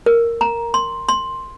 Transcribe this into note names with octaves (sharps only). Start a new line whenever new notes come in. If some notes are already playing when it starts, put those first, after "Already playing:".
A#4
A#5
C6
C6